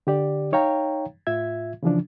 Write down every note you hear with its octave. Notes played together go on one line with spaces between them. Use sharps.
D3 G4 D5
D#4 C#5 F5 G5 A#5
A2 F4 E5 G#6
C#3 E3 F3 D4